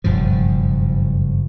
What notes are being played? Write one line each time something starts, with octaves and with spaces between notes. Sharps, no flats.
F#1 G2 B2 F3